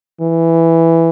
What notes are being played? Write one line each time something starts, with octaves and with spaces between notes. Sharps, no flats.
E3